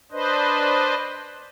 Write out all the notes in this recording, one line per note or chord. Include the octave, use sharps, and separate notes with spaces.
D4 B4 C5 D#5